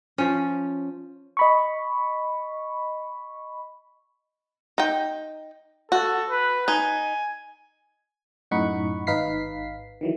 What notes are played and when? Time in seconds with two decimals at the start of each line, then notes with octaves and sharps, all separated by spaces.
0.18 F3 C#4
1.37 D#5 B5 C#6
4.78 D#4 G5
5.92 F#4 A4
6.29 B4
6.68 D#4 G#5
8.51 F#2 A2 D#4 F#5 B5 C#6
9.07 G#1 D#4 B4 F5 B6 C7
10.01 D#3 E3 F#3